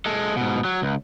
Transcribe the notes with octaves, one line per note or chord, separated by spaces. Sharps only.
G#3 A4
G#2 B2
F#3
C#2